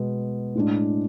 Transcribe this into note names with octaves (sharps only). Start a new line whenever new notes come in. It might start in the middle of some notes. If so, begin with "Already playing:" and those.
Already playing: B2 G#3 B3
A2 G#3 D4